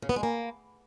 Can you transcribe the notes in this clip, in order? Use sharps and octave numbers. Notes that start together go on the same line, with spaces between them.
C#3
B3
G#3
A#3